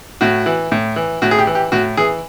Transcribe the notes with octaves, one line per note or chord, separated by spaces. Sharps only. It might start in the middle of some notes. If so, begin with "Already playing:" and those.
A2 F#4
E3
A2
E3
A2 F#4
G#4
G4
E3
G4
A2 F#4
E3 G#4